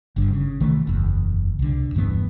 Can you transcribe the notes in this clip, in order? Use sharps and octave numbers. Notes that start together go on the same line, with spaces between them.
G1 G2 D3
C#3
C2 D#3 E3 A3
F#1 E2
C2 D3
E1 G2 E3 B3